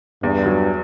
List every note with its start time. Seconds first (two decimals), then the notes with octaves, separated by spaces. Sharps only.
0.23 E2 G2
0.46 F#3